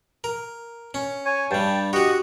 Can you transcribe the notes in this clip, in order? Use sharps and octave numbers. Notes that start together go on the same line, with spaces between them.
A#4
C#4
C#5 G#5
G2 G3 G5 A5
F#4 G4 D#5 F#5 C#6